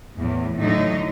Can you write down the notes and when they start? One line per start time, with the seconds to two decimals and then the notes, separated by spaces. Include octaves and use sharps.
0.17 E2 A2
0.58 A2 D3 F#3 D#4